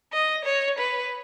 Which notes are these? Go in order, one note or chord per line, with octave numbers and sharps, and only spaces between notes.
D#5
C#5
B4